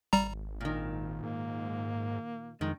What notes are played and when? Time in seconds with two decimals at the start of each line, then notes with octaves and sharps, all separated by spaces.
0.13 G#1 G3 A#5
0.61 A#2 D#3
1.23 G#2 A#3
2.61 F2 D#3 G#3